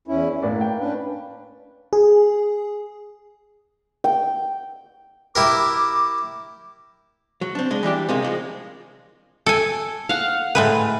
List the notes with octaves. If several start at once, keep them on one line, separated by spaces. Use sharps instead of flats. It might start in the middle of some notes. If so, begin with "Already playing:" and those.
E2 C#4 E4
A2 A#3 B4 D5
G5
C#4 D4 B4
G#4
G5
E4 G4 A#4 D6
F#3
C4 D4
G#3 D4
E3 G3 D4 G4
C3 G#3 A#3 D#4
F3 F#3 G#3
A4 G#5
F5 F#5
A2 G#3 B4